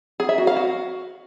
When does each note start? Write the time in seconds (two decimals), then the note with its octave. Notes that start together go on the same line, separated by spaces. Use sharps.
0.20 G#4
0.29 E5
0.38 F#4
0.47 F5
0.56 F#4